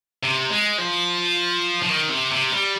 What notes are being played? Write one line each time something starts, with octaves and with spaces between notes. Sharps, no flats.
C3
G#3
F3
F3
D#3
C3
C3
G3